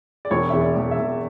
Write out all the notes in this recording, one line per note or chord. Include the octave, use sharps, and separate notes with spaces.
D5
E1 C#5
E2 E5
D5
E1
E5
E1